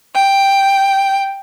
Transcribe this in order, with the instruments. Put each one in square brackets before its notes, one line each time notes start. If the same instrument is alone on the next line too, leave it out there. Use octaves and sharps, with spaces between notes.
[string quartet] G5